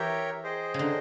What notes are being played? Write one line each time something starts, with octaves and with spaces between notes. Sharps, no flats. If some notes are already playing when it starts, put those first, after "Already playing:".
Already playing: E3 G4 A#4 C#5 E5 G5
G#4 C5 D#5 G5
C#3
D3